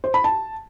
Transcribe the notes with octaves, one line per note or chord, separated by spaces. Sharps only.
C5
B5
A5